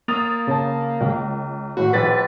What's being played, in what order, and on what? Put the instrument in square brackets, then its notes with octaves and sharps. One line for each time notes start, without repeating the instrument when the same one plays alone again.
[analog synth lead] A#3 [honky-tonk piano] D#6 A6 F7
[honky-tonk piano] C#3 A5
C#2
[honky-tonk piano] A1 A2 [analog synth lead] F#4
[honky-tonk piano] A#1 A6 B6 [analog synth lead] B4